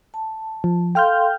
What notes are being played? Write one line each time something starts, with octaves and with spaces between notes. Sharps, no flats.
A5
F3
A4 F5 G5 C6 F6 G6